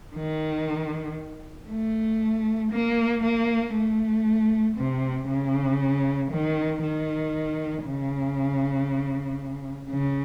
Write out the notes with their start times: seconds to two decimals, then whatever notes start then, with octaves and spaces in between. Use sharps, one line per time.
0.15 D#3
1.69 A3
2.72 A#3
3.23 A#3
3.74 A3
4.77 C3
5.28 C#3
6.31 D#3
6.82 D#3
7.84 C#3
9.90 C#3